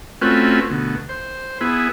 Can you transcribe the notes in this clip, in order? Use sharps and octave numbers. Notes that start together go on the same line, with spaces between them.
A3 C4 C#4 F4 F#4 B4
D2 B2
C5
B3 E4 G#4